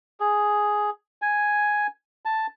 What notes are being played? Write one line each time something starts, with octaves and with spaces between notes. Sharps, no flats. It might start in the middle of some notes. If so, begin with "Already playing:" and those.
G#4
G#5
A5